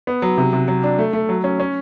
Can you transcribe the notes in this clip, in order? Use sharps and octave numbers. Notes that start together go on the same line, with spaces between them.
B3
F#3
C3
C3
F#3
D4
A3
A3
F#3
C#4
C#4